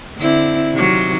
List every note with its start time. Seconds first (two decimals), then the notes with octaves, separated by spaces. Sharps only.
0.17 D3 C4 E4
0.73 C3 D#3 F#3